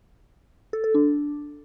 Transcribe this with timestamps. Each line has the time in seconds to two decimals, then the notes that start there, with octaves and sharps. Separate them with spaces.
0.73 A4
0.84 A4
0.94 D4